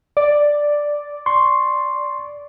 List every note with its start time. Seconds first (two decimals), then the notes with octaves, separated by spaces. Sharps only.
0.17 D5
1.26 C6 C#6